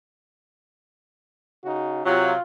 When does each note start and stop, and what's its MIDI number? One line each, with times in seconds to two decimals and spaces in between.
1.64 2.03 49
1.64 2.03 63
1.64 2.03 66
2.05 2.32 48
2.05 2.32 54
2.05 2.41 65